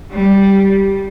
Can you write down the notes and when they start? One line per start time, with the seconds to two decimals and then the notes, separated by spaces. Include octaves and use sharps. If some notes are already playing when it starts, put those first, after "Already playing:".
0.12 G3